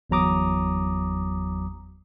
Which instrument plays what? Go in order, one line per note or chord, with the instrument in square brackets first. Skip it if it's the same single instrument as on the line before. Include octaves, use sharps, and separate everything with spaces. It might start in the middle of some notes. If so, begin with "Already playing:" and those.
[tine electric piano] G1 E2 F#3 A#5 D6 D#6